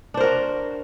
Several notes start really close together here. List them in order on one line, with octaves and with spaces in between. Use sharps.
D4 C5 A#4 F#4